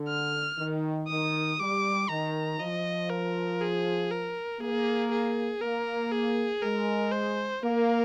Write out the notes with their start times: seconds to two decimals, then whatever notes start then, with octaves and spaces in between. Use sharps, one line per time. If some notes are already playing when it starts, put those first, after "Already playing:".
Already playing: D3
0.08 F6
0.58 D#3
1.08 D#3 D#6
1.59 G3 D6
2.09 D#3 A#5
2.59 F3 D#5
3.09 A#4
3.61 G#4
4.11 A#4
4.61 A#3 G#4
5.11 G#4
5.61 A#3 A#4
6.12 G#4
6.63 G#3 A#4
7.12 C5
7.63 A#3 A#4